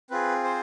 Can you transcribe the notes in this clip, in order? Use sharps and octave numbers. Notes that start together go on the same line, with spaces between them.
C4 F4 G#4 B4
C5